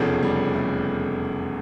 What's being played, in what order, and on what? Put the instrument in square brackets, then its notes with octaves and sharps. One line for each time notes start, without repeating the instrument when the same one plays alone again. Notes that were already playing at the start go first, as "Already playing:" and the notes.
Already playing: [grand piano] F1 E2 C#3 [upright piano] F3
[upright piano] G3
A3